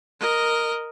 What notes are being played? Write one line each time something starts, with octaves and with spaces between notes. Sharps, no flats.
A#4 D#5